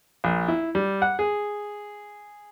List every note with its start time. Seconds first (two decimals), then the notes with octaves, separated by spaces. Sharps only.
0.24 A#1
0.48 E4
0.75 G3
1.02 F#5
1.19 G#4